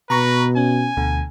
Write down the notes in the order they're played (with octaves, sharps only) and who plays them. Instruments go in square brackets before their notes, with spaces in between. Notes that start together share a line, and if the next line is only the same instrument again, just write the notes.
[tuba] B2 [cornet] B4 [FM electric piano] A#5 C#6 A#6
[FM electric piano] C#4 [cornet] G#5
[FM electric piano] D2 B2 D3